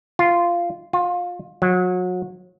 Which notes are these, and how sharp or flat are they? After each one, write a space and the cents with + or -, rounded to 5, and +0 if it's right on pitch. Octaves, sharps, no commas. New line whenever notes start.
F4 -10
F4 +25
F#3 -30